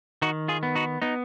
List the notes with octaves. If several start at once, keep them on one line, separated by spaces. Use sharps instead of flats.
D#3 D#4 F#4
F4 G#4
B3
D#4 F#4
B3 D#4